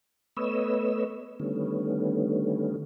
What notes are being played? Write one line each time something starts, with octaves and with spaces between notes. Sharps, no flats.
A3 B3 B4 C#5 D#5 E6
D3 D#3 G3 A3 B3 C#4